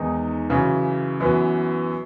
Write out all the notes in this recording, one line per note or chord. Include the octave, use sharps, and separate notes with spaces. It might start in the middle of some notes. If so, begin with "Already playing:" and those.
Already playing: E2 D#3 G#3 D#4
F#2 C#3 E3
F#2 E3 B3